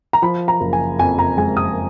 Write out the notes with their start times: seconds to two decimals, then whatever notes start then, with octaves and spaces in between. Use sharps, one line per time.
0.13 A#5
0.22 F3 B5
0.48 A#5
0.61 F#1
0.73 G#5
0.99 F2 G#5
1.19 A#5
1.37 G#3 G#5
1.57 D#6